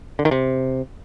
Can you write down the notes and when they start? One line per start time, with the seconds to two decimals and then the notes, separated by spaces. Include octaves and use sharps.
0.19 D3
0.25 D#3
0.31 C3